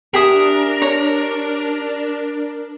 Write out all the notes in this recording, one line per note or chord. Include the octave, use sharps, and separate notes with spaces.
D4 G4 G#4 A#4 E5 D#6
C#5 A#5